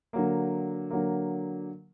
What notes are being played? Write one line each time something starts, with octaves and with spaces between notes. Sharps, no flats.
D3 F#3 A#3
D3 F#3 A#3